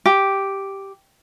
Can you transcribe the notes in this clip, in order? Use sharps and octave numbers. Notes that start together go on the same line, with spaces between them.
G4